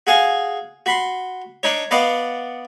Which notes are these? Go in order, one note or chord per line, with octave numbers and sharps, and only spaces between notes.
F#4 G#4 F5 G#5
F#4 B5 C6
D4 D#4 C#5
B3 D5 D#5 F5 F#5